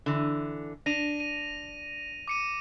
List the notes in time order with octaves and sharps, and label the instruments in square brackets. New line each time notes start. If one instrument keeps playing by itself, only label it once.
[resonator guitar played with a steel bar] D3 E3
[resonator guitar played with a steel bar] D4 [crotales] A#6 D#7 F7
[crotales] D#7
D6 C#7 D#7